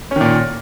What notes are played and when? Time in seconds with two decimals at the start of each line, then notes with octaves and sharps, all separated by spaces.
0.11 C#4
0.16 D#3
0.21 A#2